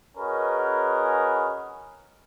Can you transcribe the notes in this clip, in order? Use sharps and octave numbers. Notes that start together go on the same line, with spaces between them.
C#4 F#4 G#4 A#4 B4 D#5